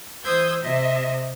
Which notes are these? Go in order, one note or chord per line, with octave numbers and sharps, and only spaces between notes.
E3 C5 D#6 E6 G6 G#6
C3 D#5 E5